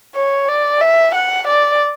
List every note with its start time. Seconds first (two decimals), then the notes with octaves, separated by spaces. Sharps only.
0.15 C#5
0.48 D5
0.81 E5
1.15 F#5
1.48 D5